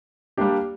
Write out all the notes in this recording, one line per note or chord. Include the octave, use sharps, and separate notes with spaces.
G3 A#3 D4 G4